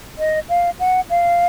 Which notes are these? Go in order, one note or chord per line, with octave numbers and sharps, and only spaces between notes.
D#5
F5
F#5
F5